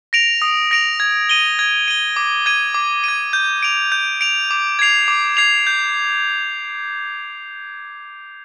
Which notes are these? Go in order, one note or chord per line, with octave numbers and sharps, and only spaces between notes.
A#6 D7 F7
D#6
A#6 D7 F7
G#6
D#7 G7
G#6
D#7 G7
D6
G#6 D#7
D6
G#6 D#7
G6
D7 F7
G6
D7 F7
D6
G#6 C7 F7
D6
G#6 C7 F7
G6